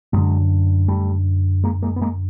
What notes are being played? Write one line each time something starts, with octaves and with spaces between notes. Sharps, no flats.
F#2 D3 F#3 G#3
G3 A3
G#3 A#3
G#3 A#3
B3
G#3 A#3